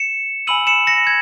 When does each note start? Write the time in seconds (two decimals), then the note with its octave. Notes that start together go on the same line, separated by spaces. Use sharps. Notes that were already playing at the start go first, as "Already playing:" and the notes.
Already playing: C#7 E7
0.47 G#5 B5 E6 D#7 F#7
0.67 C#7 E7
0.87 A#6 C#7
1.07 G#6